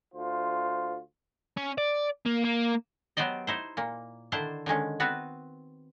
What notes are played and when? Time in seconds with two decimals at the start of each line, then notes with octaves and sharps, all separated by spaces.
0.14 D2 F4 C5
1.57 C#4
1.78 D5
2.26 A#3
2.45 A#3
3.17 F#3 B3 G4 C5 D5 D#5
3.47 D#4 E4 C5
3.77 A#2 A#3
4.32 D3 D#3 D4 E4 C5 A5
4.66 D3 D#3 G#3 C#4
5.00 B3 C4 F#4 B4